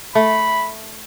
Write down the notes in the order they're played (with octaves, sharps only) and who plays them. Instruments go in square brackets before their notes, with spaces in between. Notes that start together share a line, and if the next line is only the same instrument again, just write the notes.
[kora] A3 [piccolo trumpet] B5